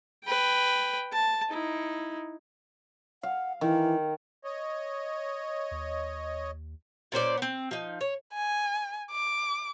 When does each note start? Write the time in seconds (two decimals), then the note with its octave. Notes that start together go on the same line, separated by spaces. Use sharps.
0.25 B4 G5
1.13 A5
1.50 D#4 E4
3.23 F5 F#5
3.61 D#3 E3
4.44 C#5 D#5
5.71 D#2
7.12 A#2 C#4 C5 D5
7.37 B3 C4
7.71 F3 D#4
8.01 C#5
8.34 G#5
9.11 D6